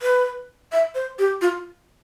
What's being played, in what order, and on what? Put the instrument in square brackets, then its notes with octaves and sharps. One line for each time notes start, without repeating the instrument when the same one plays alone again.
[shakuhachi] B4
E5
C5
G4
F4